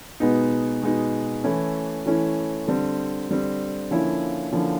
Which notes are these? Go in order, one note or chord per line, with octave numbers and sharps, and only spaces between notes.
B2 G#3 B3 D#4
B2 G#3 B3 D#4
E3 A3 C#4 E4
E3 A3 C#4 E4
D3 G3 C4
D3 G3 C4
D3 F3 A#3 C#4 E4
D3 F3 A#3 C#4 E4